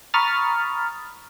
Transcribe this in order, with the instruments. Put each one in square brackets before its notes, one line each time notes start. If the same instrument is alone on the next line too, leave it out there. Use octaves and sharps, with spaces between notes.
[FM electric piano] A#5 B5 C#6 D#6 F6 A6